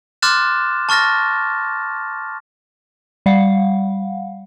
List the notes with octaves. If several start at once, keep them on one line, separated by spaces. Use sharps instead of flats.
C6 D6 F6 F#6 A6 E7
A5 C#6 F6 A6 A#6
G3 F5 F#5